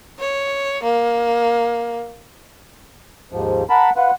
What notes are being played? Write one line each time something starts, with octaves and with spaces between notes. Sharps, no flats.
C#5
A#3
D#2 G#2 F3
A#4 F#5 A5 B5
F4 B4 F#5